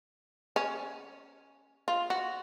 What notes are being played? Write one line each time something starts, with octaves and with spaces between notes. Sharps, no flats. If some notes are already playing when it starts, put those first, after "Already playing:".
C#4
F4
F#4